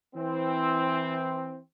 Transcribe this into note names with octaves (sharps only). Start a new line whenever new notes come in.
E3 C4